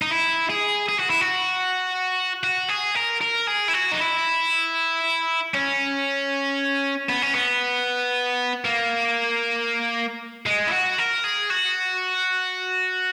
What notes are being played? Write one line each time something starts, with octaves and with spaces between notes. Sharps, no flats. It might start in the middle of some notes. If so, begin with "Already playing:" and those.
D#4
E4
G#4
G#4
F#4
E4
F#4
F#4
G#4
A#4
A#4
G#4
E4
F#4
D#4
E4
C#4
B3
C#4
B3
A#3
G#3
E4
F#4
A#4
G#4
F#4